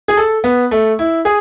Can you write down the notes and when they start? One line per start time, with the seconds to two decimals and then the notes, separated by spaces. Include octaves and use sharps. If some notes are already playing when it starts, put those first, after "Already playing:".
0.08 G#4
0.17 A4
0.44 B3
0.71 A3
0.99 E4
1.25 G#4